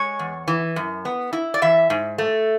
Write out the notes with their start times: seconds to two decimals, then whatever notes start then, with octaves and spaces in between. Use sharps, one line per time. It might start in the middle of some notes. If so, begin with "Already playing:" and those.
Already playing: G#3 C#5
0.19 E2
0.48 E3
0.76 F#2
1.05 B3
1.33 E4
1.54 D5
1.62 E3 E5
1.90 G#2
2.18 A3